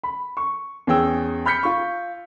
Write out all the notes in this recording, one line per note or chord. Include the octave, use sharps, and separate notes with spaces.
B5
C#6
E2 C#4 G#4 G5 E6
B5 F6 G6 B6 C#7
F4 C#6